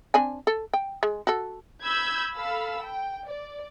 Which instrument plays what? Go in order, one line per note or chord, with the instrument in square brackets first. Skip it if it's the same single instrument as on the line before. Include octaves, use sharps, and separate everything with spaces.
[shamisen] C4 D4 G#5
A4
G5
G#3
F#4 A4
[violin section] B5 E6 G6 G#6
A4 F5 B5 E6
G5
D5